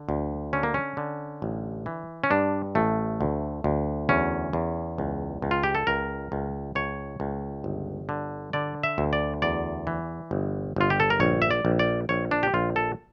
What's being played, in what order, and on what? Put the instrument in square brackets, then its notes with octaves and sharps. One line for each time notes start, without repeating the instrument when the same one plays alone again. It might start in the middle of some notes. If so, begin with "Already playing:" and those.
Already playing: [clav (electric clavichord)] D3
D2
D3 C#4
A#3
C#4
D3
A1
E3
C#4
G2 D4
A1 A3
D2
D2
E2 C#4
E2
C#2
C#2
F4
G4
A4
C#2 A#4
C#2
C#2 C#5
C#2
G1
D3
D3 D5
E5
D2
D5
E2 D5
E3
G1
G1 F4
G4
A4
A#4
A#1 C#5
E5
D5
A#1
D5
A#1 C#5
D4
G4
A#1 F4
A4